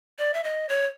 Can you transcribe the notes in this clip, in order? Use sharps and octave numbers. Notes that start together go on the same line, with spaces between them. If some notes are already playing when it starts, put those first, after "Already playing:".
D5
E5
D#5
C#5